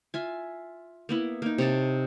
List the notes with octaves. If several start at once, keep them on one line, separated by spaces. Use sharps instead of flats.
F4 E5 G#5
A#3 B3 E4
A#3 D#4
C3 C#5 D#5 A5